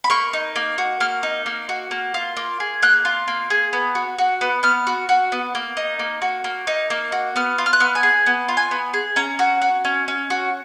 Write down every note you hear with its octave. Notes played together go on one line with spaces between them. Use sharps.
B5
A#3 C#6
D#4
A#3
F#4
A#3 F6
D#4
A#3
F#4
A#3
F4
A#3
G#4
A#3 F#6
F4
A#3
G#4
B3
F#4
F#4
B3
B3 F6
F#4
F#4
B3
A#3
D#4
A#3
F#4
A#3
D#4
A#3
F#4
B3 F6
F4
F6
F#6
B3 F6
G#5
G#4
B3
F4
G#5
B3
G#4
C#4 A#5
F#4
F#4
C#4
C#4
F#4